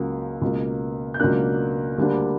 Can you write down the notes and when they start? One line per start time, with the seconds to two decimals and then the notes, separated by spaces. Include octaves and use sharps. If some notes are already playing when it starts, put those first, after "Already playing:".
Already playing: C#2 C#3 F#3 A#3
0.41 C#2 B2 A#3
1.14 G6
1.19 C#2 B2 F#3 A#3 D4 F#6
1.98 D2 D3 G3 A#3 D4